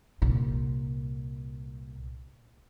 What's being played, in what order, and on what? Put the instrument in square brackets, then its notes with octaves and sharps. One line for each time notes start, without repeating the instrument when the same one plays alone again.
[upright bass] C2 A#2